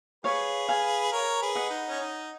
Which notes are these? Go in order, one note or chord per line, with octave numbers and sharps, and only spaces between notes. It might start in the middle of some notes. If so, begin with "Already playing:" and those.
G#4 B4 C#5 F5
F5 G#5
A#4 C#5
G#4 B4
D#5 F#5
D#4
C#4
D#4